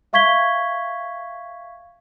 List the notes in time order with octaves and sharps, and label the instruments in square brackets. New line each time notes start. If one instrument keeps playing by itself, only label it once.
[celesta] E5 F5 C#6 G#6 B6 G7